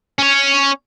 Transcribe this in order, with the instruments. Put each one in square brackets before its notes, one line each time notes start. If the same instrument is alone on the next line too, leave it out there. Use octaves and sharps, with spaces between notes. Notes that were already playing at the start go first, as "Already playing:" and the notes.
[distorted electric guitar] C#4 C#5